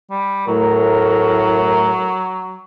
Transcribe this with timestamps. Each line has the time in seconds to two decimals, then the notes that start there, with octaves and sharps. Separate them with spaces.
0.11 G3
0.47 A2 F#3 A#4